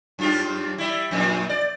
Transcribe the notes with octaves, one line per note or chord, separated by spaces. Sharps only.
F#2 F4 G4
G3 E4
F2 A#2
D5